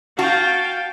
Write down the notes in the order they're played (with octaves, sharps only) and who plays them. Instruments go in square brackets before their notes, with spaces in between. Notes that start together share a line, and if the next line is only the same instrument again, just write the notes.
[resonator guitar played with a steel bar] F#4 [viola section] F5 G5 [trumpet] A5